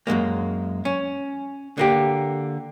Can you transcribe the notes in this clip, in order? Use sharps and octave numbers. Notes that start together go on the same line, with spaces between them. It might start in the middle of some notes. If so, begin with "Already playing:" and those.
F#2 A#2 G#3 A#3
C#4
D3 A#3 G4